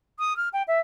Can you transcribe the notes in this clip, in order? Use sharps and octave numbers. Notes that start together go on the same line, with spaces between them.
D#6
F6
G5
E5